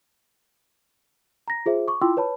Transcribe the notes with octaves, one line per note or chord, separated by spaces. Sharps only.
A#5 A#6
F4 G#4 C5 E5
C#6 D6
E4 F4 G5 C6 D6 E6
B4 C#5 A5 B5